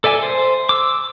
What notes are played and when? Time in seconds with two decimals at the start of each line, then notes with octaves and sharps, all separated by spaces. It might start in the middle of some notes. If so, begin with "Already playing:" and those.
0.04 A4 D5 E5 G#5
0.22 C5
0.69 D6 E6